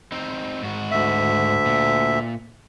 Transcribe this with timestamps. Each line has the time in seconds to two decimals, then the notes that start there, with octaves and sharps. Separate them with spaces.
0.12 C4 D#4
0.63 G#2 F#4
0.91 D2 E5
1.66 A#2